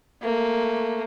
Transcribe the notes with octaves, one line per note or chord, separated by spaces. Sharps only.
A3 A#3